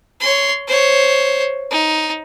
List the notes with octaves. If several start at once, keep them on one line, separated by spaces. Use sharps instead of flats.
C#5 C6
C5 C#5
D#4